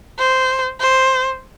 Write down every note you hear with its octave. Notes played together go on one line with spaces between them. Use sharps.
C5
C5